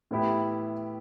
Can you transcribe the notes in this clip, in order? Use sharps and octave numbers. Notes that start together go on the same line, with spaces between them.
A2 E3 B3 E4 G4